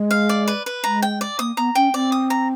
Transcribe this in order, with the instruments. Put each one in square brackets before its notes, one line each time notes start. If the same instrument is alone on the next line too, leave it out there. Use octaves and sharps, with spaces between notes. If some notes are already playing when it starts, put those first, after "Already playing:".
Already playing: [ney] G#3
[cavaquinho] F5
D5
B4
B4
[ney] G#3 [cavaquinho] A#5
[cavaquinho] G5
D5
[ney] A#3 [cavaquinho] D#6
[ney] B3 [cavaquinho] A#5
[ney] C#4 [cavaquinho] G5
[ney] C4 [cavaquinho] D5
[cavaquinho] D#6
A#5